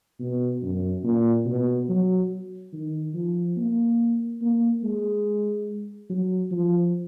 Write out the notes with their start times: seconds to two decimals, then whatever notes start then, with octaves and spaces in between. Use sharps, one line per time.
0.20 B2
0.62 F#2
1.04 A#2
1.45 B2
1.89 F#3
2.73 D#3
3.14 F3
3.57 A#3
4.42 A#3
4.83 G#3
6.09 F#3
6.51 F3